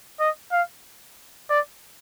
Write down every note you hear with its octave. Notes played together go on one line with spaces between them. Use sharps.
D#5
F5
D5